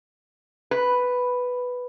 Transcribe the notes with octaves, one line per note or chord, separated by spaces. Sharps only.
B4